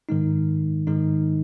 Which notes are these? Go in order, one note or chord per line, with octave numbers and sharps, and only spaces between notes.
G#2 D#3 G#3 D#4
G#2 D#3 G#3 D#4